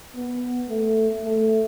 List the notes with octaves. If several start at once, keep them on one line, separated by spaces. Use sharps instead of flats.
B3
A3
A3